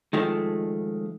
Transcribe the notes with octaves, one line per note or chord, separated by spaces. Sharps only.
D#3 F3 G#3 A3